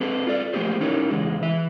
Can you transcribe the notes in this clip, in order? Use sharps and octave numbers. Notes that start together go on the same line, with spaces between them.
C4 G#4 A4 B4
F4 A4 D5
F3 A3 A#3 G4 G#4 C5
C#4 D#4 E4 G4 A#4 C#5
E2 C#3 G#3
E3 E5